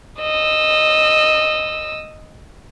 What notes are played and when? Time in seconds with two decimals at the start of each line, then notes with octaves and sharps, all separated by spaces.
0.20 D#5 E6